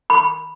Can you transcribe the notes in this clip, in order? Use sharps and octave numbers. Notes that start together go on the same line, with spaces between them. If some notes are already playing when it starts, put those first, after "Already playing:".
B5